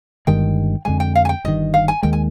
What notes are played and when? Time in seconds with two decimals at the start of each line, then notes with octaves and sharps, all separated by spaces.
0.27 G1 G2 D#3 G#3 G5
0.85 F2 D3 G#3 G#5
1.00 G5
1.15 F5
1.25 G#5
1.29 G5
1.44 G1 G2 D#3 D#5
1.74 F5
1.88 G#5
2.03 D#2 D#3 G#3 G5
2.13 G#5